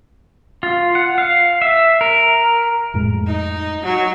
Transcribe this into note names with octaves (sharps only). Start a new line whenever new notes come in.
F4
F#5
F5
E5
A#4
F2 A2 G#3
D#4
F#3